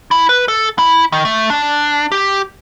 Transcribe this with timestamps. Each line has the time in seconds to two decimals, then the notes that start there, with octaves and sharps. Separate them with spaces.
0.11 E4
0.29 B4
0.48 A4
0.79 E4
1.12 D#3
1.25 A3
1.50 D4
2.12 G4